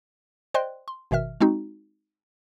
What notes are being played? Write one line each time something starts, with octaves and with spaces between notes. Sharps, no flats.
C5 D5 D#5 G5 C6 F#6
C6
G#1 B2 D#3 E5 F6
G#3 C4 D#4 F#4